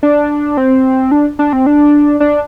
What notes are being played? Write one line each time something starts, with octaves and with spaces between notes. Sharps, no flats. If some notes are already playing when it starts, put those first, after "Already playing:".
D4
C4
D4
D4
C4
D4
D4